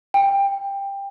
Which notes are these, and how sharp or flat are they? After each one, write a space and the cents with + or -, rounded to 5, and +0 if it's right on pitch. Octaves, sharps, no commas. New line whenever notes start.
G5 +15